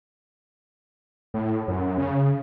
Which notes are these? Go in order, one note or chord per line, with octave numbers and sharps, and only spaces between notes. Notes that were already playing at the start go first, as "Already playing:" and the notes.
A2
F#2
C#3